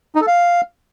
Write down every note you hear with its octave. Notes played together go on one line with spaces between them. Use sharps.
D#4
A4
F5